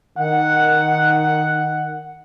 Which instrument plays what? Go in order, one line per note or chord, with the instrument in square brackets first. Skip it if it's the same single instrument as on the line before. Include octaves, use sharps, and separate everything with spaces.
[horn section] D#3 F#5